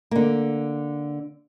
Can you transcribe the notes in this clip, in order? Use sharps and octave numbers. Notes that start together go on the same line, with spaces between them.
D3 A#3